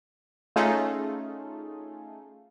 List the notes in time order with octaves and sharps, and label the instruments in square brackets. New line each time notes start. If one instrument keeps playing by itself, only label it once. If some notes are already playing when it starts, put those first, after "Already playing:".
[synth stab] A3 C#4 D#4 F4 G#4 A4